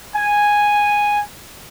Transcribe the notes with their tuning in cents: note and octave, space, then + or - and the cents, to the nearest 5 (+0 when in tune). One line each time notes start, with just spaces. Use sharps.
G#5 -5